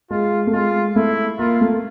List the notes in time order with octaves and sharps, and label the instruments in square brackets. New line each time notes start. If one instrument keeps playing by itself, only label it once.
[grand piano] G#3 [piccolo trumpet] F4
[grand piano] A3
[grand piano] G#3 [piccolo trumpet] F4
[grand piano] A3 [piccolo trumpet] E4
[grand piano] A#3 [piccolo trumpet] F4
[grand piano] A3